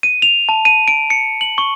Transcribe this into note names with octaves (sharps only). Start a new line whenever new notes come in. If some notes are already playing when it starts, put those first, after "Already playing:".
D#7
F7
A5
D#7
D7
C#7
F#7
C#6